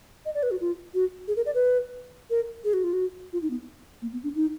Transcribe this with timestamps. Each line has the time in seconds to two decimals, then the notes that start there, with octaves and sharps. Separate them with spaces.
0.25 D#5
0.35 D5
0.43 B4
0.51 F#4
0.61 F4
0.94 F#4
1.28 G#4
1.36 A#4
1.46 D5
1.55 B4
2.30 A#4
2.64 G#4
2.74 F#4
2.84 F4
2.93 F#4
3.33 F4
3.42 D#4
3.50 B3
4.02 A#3
4.13 B3
4.24 D4
4.35 D#4